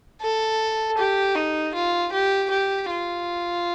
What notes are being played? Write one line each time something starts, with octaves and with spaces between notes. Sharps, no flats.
A4
G4
D#4
F4
G4
G4
F4